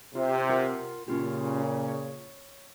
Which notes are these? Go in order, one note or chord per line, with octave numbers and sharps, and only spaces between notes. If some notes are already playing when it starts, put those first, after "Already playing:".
C3 F4
F4 A#4 F#5
A#2 C#3 C#4 F4 G4
C#5